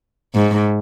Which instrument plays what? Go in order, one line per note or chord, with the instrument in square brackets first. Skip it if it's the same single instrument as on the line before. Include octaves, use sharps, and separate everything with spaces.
[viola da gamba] G#2